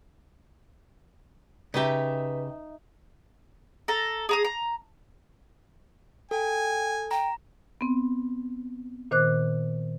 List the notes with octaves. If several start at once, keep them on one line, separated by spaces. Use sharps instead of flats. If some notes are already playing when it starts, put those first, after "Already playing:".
C#3 D#4 G4 B4 D#5 E5
A4 A#5
G#4 A#5 D#6
A#5
A4 G5 G#5
G5 A#5
B3 C4
A#2 D#3 C5 D6 F#6